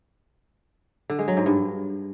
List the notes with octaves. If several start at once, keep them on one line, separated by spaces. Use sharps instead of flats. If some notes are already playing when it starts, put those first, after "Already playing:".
D3
G#3
F#3
G#2
G2